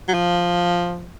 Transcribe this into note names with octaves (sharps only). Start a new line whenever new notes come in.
F#3
F3